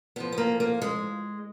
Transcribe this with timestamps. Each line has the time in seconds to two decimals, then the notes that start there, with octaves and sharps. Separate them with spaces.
0.16 A2 F3 B3
0.32 B3
0.38 A#3
0.60 A#3
0.82 G#3